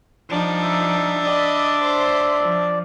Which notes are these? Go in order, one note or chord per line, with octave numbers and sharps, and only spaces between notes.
F3 G3 D4 D#4
E5
D5 D#5 B5
C5 C6
F3